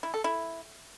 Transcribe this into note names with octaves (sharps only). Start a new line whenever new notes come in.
E4
A4
E4